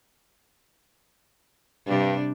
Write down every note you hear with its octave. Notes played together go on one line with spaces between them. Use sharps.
G2 C3 G3 D4